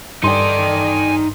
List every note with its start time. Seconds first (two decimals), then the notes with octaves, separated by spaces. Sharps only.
0.24 G2 D#4 A4 D5 G5 G#5 C6